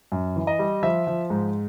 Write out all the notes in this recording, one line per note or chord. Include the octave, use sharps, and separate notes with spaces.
F#2
E3
D#5
G3
F3 E5
F3
G#2